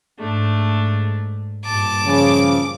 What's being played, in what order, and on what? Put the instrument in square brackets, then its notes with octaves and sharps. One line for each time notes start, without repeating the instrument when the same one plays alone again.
[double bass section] G#2 [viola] A3 D4
[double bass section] G2 A#2 [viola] A5 [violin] D6
[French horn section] C#3 F3